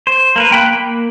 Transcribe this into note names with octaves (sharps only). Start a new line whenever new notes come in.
C5
A#3 A#4 B4
A#3 G5 B5 F#6
A#3